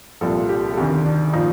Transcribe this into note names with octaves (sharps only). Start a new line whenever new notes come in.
C2 A#2 F3 A4
G4
A4
D2 C3 D#3 G4
D4
A#2 F3 D#4